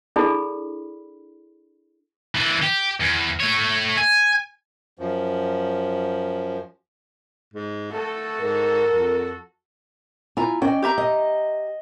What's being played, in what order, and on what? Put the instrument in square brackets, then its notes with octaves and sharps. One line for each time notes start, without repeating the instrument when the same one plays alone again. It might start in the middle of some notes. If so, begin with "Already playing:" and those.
[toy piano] D4 E4 G#4 A4 D5 B5
[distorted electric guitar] E3 D4
G4
E2
A3 C#5
G#5
[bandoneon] F#2 F3
[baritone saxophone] G#2
[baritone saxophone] A3 [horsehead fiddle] F#4 A4
[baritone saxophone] G#2 [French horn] A#4
[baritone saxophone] F2
[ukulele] E4 A#5 [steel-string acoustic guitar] F4 G#5
[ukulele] C#4 D#5 [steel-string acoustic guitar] D5 G5
[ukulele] G4 E5 A#5
[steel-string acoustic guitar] D#5